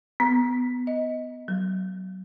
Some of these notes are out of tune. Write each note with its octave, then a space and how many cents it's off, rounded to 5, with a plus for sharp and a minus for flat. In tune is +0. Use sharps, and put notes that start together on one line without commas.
B3 +15
D#5 +15
F#3 +20